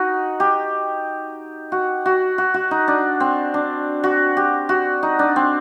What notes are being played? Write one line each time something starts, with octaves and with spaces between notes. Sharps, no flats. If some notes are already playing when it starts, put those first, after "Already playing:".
Already playing: D#4 F#4
G4
F#4
F#4
F#4
F#4
D#4
D4
C4
D4
F#4
G4
F#4
D#4
D4
C4